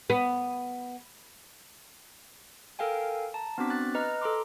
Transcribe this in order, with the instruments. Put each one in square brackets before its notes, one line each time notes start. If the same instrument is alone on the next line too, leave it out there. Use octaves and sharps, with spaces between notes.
[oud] B3
[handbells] A4 A#4 F5 G5 G#5
A5 A#5
B3 C4 D4 F#4 D6 B6
F#6 A6
B4 D#5 A#5 F6
A4 A#5 C6 D6